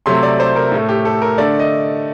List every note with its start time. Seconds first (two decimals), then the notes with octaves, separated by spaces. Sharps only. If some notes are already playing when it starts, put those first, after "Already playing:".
0.06 C3 F#3 A3 C6
0.23 D5
0.40 C5
0.56 A#4
0.72 A2 A3
0.89 G4
1.05 A4
1.22 A#4
1.38 D3 A3 D5
1.59 D#5